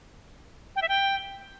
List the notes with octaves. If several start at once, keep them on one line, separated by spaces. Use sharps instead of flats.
G5
E5
G5